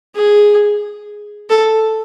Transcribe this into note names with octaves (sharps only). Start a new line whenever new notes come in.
G#4
A4